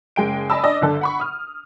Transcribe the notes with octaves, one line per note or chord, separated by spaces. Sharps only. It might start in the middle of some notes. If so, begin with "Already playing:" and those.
F#1 G#3 G5 D7
D5 D#5 G#5 A5 B5 E6
D4 D5 D#5
G1 D3 A4
F#5 B5 C#6
D#6 F6